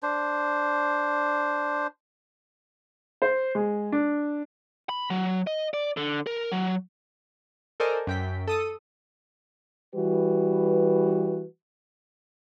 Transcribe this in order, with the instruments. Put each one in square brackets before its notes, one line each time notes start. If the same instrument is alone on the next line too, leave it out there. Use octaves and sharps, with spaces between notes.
[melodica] D4 C5
[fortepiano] C5
G#3
D4
[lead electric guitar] B5
F#3
D#5
D5
D3
A#4
F#3
[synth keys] A4 A#4 C5 D5 D#5 G#5
F#2 G5 B6
A4 D#6 D#7
[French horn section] E3 G3 F#4 B4